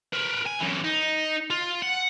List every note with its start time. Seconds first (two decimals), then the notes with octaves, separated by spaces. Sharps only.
0.13 A#4 B4
0.46 G#5
0.60 F#2 E3
0.84 D#4
1.50 F4
1.82 F#5